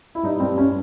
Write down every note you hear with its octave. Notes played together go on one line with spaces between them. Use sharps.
E4
G2 D#4
G2 C4
C#4